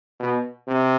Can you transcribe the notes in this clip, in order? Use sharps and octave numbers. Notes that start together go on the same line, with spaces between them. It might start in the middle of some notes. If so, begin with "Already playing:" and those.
B2
C3